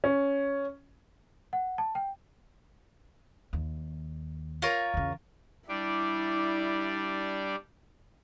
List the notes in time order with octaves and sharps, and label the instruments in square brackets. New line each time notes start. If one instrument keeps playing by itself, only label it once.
[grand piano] C#4
[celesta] F#5
A5
G5
[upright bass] D#2
[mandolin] F4 A#4 C#5
[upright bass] E2 C#3
[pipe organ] G3 D4 D5 [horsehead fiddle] E4